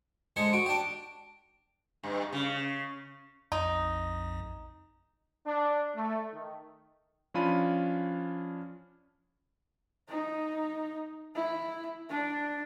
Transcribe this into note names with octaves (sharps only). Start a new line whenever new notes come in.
D3 G#3 C5 C#7
F#4 D7
D4 G4
G2
C#3
A#1 F2 D#4
D4
A3
D#3
F3 C#4 D4 F4 B5 D#7
D#4
E4
D4